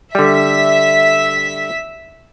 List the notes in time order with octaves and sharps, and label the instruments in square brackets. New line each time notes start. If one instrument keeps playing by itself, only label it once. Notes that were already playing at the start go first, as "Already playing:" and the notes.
[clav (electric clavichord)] D3 G3 [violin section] E5 B6